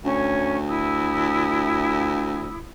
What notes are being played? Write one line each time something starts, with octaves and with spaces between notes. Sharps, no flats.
D2 C#4 C#5 C#6
E4 D#6 E6